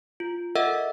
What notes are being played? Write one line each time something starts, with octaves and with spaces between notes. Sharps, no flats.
F4
A4 A#4 D#5 E5 F#5 E6